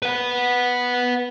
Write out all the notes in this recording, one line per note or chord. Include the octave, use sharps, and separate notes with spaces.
B4 F#5